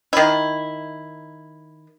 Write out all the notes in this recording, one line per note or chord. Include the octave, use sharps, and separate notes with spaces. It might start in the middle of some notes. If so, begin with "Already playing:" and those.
D#3 E4